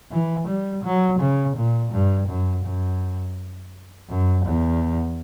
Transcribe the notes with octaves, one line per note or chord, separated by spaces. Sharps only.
E3
G3
F#3
C#3
A#2
G2
F#2
F#2
F#2
E2